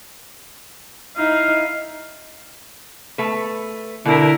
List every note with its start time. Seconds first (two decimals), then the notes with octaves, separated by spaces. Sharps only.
1.17 D#4 E4 D#5 F5
3.18 A3 B4
4.05 B2 D3 E4 A#4